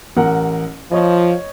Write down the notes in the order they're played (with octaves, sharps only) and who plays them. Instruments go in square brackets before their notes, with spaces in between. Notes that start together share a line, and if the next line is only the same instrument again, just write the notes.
[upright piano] A1 A#4 F#5
[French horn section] F3 [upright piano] C#5 D#5